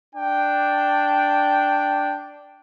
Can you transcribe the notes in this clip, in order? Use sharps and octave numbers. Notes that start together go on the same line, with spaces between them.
D4 G5